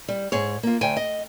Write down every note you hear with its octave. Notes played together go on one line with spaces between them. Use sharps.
G3
G#2 G#4 C#5
A#3 F4
D2 G5 G#5
D#5